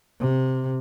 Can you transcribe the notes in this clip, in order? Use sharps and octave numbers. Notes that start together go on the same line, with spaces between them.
C3